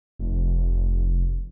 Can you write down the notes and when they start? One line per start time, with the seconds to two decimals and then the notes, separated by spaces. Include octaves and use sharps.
0.19 F1